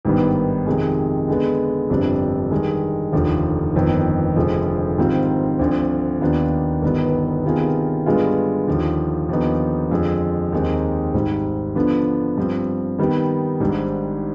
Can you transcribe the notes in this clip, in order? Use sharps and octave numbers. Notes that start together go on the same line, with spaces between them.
G#1 G2 D#3 B3
F2 C3 D#3 G#3
D3 G#3 B3
G1 F2 C3 G3 D4
G2 D#3 G#3
F1 D#2 D3 F3
G1 F2 D#3 B3
F1 F2 D3 F3 G#3
G#2 D#3 G3 C4 F4
D2 D3 F3 C4
D#2 D#3 B3 D4 F4
G1 G2 D#3 B3
C3 D#3 B3 F4 G#4
G2 D3 G#3 B3 F4
D#2 D3 F3
D#2 D3 F3 B3 D#4
F2 D3 F3 G#3
D#2 D#3 G#3 C4
G#1 G#2 G3
D3 F3 B3 D4
G2 F3 C4
D#3 G3 B3 D#4
G#1 G#2 G3 D4